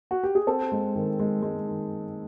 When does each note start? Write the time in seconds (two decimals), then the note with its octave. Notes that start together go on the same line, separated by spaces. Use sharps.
0.11 F#4
0.24 G4
0.35 G#4
0.47 C4 A4
0.72 G#3
0.95 D#3
1.20 G#3
1.42 G#3
1.67 D#3